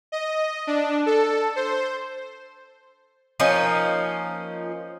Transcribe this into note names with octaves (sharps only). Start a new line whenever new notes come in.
D#5
D4
A4
C5
F3 A#3 C#4 D#4